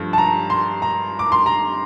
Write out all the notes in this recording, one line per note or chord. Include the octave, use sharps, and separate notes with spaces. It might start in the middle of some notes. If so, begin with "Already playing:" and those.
Already playing: G2 F3 A3
A5
A#5
C6
A#5
D6
C6
A#5